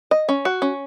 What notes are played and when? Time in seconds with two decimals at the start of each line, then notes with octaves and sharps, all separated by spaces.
0.11 D#5
0.29 C#4
0.45 F#4
0.62 C#4